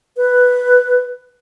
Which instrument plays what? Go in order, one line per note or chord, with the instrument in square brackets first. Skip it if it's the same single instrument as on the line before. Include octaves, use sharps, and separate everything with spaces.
[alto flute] B4